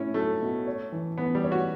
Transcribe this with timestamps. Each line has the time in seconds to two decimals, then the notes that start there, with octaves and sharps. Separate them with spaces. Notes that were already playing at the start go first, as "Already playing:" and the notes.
Already playing: A2 C#4 E4
0.14 F#3 A3
0.41 B2
0.67 C#5
0.92 E3
1.18 E3 B3
1.35 G3
1.43 C#5
1.52 F#4